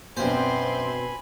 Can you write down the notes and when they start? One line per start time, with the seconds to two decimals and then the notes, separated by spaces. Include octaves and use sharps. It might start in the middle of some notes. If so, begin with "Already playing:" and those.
0.17 F#2 B2 C4 D4 C5 G#5 B5 C6